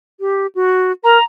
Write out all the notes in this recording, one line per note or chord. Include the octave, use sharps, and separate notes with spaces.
G4
F#4
A#4 A#5